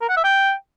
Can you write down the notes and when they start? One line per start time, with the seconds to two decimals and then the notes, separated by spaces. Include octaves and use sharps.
0.02 A#4
0.09 F#5
0.17 E5
0.24 G5